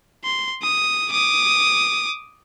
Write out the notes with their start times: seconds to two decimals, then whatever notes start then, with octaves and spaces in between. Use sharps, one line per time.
0.25 C6
0.62 D#6
1.10 D6 D#6